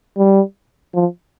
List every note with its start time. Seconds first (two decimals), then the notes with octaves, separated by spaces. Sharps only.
0.18 G3
0.94 F3